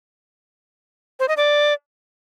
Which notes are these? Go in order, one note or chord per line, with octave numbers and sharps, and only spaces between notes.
C5
D#5
D5